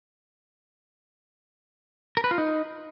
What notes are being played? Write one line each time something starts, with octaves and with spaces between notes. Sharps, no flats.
A#4
B4
F4
D#4